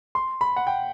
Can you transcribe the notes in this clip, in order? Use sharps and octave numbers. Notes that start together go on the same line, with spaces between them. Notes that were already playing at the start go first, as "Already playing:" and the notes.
C6
B5
F#5
G5